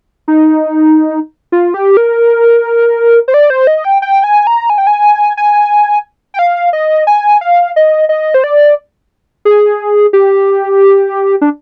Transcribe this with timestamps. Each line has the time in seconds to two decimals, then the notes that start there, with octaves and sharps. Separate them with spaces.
0.28 D#4
1.52 F4
1.74 G4
1.97 A#4
3.28 C5
3.34 D5
3.50 C5
3.67 D#5
3.84 G5
4.02 G5
4.24 G#5
4.47 A#5
4.70 G#5
4.78 G5
4.87 G#5
5.37 G#5
6.34 G5
6.39 F5
6.73 D#5
7.07 G#5
7.41 F5
7.76 D#5
8.09 D#5
8.34 C5
8.44 D5
9.45 G#4
10.13 G4
11.41 D4